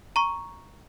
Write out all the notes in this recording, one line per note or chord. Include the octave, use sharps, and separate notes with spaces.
A#5 C#6